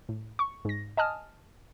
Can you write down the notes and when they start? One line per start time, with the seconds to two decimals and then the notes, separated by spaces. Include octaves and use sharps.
0.09 A2
0.39 C#6
0.65 G#2 A#6
0.97 D#5 G#5 A5 D#6 F6